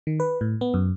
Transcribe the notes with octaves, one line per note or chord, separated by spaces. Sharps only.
D#3
B4
A2
B3
F#2